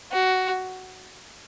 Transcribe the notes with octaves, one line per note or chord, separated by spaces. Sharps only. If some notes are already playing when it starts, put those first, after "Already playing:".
F#4